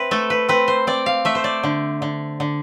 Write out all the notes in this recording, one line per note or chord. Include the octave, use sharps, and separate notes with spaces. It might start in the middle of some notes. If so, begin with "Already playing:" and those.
Already playing: C4 B4 E5
A3 A4
B4
C4 B4
C5
C4 D5
F5
A3 E5
C5
D5
D3
D3
D3